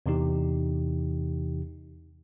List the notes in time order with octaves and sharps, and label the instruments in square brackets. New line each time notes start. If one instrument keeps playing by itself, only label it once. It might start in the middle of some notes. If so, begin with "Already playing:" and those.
[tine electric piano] E2 C3 E3 D#4 G4